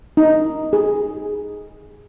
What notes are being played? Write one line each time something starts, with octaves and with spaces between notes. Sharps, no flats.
D#4
G#4